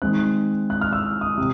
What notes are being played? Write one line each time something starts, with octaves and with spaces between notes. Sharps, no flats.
D#3 G#3 C4 F#6
F#6
F6
E6
D#6
C3